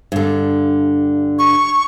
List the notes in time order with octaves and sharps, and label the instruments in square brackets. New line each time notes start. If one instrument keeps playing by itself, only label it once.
[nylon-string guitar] G2 D3
[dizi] C#6